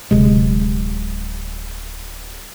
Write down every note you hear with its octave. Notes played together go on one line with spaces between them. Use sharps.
D1 C3 G#3